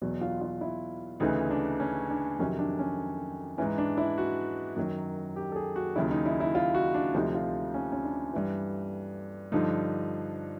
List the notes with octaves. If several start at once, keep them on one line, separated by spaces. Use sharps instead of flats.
E2 B2 F#3
F4
F4
E4
D2 C#3 E3 D#4
D4
C#4
D4
F2 C3 D#3 F#3 C#4
D4
C#4
G#2 E3 C#4
D4
E4
F#4
F#2 D#3 F#3
G4
A4
G#4
F#4
D#2 C#3 F#3 E4
D#4
E4
E4
F4
F#4
D4
D2 C3 F3 D#4
F4
C#4
C#4
D4
G2 E3
G2 D3 F3 D#4